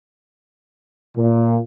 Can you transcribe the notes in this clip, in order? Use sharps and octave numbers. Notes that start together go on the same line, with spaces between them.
A#2